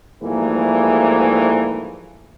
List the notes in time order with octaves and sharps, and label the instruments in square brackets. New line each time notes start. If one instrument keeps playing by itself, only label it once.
[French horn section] G#2 E3 F3 G3 A3 A#3